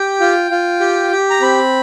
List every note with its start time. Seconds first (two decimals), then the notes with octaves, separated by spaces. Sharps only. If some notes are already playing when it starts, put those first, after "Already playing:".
Already playing: G4 G5
0.20 F4
0.51 F4
0.80 G4
1.12 G4
1.30 A#5
1.41 C4 B5